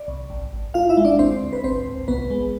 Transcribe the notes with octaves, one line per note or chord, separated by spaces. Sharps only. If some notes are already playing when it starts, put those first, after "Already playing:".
Already playing: D5
C2
G#1
G#1
G#1 F4 F5
E4 E5
G#3
D4 D5
D2 C4 C5
D2
B4
G#1 C4 C5
G#1
C2 B3 B4
G#3